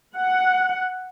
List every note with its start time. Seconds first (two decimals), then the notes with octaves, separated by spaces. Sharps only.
0.16 F#5